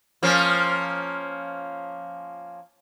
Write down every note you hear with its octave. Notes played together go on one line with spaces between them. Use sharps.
F3 A#3 C#4